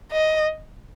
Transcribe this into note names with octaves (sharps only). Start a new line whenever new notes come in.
D#5